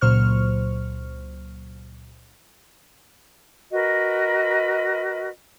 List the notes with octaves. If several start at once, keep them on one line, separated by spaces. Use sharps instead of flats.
C#2 A#2 F#3 C5 C#6 F6
F#4 A#4 B4 D#5